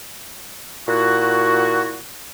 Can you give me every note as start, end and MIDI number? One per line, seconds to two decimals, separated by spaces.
0.88 1.97 46
0.88 1.97 64
0.88 1.97 66